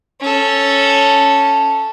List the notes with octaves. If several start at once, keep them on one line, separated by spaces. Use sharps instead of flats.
C#4 A4